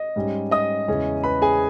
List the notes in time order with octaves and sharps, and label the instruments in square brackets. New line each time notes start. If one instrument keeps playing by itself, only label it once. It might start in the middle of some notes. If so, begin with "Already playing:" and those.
Already playing: [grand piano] D#5
G#2 G3 C#4
D#5 D#6
E2 C#3 E3 G#3 C#4
B4 B5
G#4 G#5